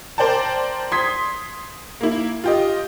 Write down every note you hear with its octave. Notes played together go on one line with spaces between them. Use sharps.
A#4 C5 D5 G5 A5
C6 D#6 G#6 B6
A#3 E4
F4 G4 D#5